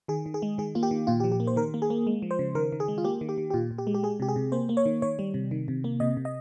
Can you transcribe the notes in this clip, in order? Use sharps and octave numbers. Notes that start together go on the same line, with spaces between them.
D#3 G#4
D#3
G#4
G#3
D#3 G#4
A#3 F4
G4
D#3
A#2 F4
G4
F3
G4
A#3
C5
D#3 A#4
A#3
G#4
A#3
G#3
F3
C5
C#3
D#3 A#4
D#3
G#4
G#3
F4
A#3 G4
D#3
G4
D#3
G4
A#2 F4
A#2
G4
G#3
G4
G#3 G#4
C3 G4
G#4
C3
A#3 C5
A#3
C#5
D#3
D#3 C#5
G3
C3
D#3
C3
A#3
C3 D#5
C3
D#5